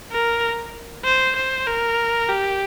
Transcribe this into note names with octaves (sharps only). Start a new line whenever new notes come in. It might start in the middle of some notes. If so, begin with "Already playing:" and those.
A#4
C5
C5
A#4
G4